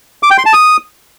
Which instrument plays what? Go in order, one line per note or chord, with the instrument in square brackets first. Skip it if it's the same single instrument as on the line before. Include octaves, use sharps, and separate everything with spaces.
[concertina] D6
G5
C6
A5
D#6